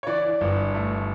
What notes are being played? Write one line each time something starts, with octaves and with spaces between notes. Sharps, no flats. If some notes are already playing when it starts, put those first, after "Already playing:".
C#5
E3 D5
G1
A3